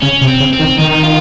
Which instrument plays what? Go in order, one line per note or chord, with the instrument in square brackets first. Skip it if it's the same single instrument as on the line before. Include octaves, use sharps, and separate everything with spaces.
[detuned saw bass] C#3 [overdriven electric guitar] C#4
[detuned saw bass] C3
[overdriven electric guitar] C4
[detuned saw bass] C#3
[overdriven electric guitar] C4
[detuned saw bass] D#3
[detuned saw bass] D#3 [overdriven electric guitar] D#4
[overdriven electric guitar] F4